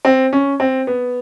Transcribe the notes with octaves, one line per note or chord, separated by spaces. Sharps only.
C4
C#4
C4
B3